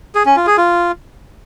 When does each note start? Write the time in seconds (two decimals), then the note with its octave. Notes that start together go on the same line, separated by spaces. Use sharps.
0.15 G#4
0.26 C#4
0.36 F4
0.47 G#4
0.57 F4